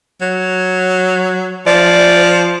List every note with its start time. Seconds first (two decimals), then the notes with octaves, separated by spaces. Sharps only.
0.21 F#3
1.66 F3 D5